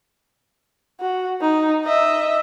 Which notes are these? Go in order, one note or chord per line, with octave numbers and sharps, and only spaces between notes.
F#4
D#4
D#5 E5